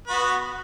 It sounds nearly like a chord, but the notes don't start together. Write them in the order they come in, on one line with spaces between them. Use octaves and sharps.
B4 F#4 B3